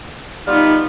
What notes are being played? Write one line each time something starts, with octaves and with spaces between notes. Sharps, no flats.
G3 B3 D#4 F4